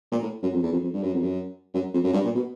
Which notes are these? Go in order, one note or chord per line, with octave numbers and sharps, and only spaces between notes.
A#2
A2
F#2
F2
E2
F2
F2
G2
F#2
F2
F#2
F#2
F2
F#2
G2
A#2
B2